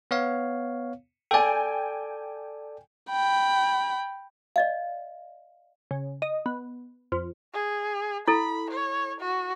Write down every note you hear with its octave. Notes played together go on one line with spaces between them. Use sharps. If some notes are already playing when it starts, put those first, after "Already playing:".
B3 C#5 F5
A4 D5 G5 G#5
G5 B5
D5 D#5 F5
C#3
D#5
B3
F2
G#4
E4 A4 B5
C#5
F#4